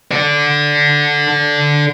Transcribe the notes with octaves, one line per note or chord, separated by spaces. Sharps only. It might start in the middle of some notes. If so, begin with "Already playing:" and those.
A4 D5